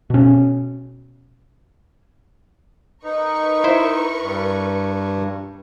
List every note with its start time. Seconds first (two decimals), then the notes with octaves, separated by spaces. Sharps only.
0.10 B2 C#4
3.04 D#4 A#4 B4 C#6
3.64 E4 C5 E5
4.21 G2